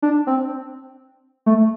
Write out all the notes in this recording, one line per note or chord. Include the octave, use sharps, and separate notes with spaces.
D4
C4
A3